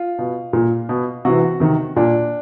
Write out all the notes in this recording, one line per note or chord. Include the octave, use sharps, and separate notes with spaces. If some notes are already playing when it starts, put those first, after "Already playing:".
Already playing: F4
B2
A#2
B2
C3 E3 F#4
C3 D#3
A#2 D4